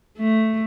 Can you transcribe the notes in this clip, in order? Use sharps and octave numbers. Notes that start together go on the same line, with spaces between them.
A3